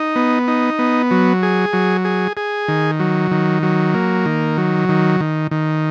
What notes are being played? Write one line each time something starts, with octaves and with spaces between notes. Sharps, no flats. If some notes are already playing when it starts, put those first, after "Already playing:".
Already playing: D#4
B3
D#4
B3
F#3
G#4
F#3
G#4
G#4
D#3
F#3
D#3
F#3
A#3
D#3
F#3
D#3
D#3
D#3